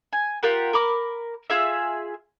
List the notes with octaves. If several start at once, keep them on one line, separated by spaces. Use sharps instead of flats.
G#5
F4 G4 A#4 F#5
A#4 B5 D6
F4 G#4 E5